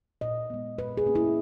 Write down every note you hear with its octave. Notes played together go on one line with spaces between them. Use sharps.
A#2 D#5
G#3 B3
A#2 B4
G#4
A#3 C#4
E4